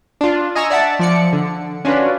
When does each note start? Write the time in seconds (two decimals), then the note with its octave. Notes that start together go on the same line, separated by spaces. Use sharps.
0.21 D4 F4
0.55 D#5 G#5 A#5 C#6 E6
0.70 D5 E5 F#5 A5
0.99 F3 D5 C#7
1.33 D3
1.85 C#4 D4 F4 F#4 B4